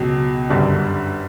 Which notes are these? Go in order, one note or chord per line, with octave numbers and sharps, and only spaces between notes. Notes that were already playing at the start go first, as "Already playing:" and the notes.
Already playing: C#2 B2 F#3
G1 F#2 D3 G3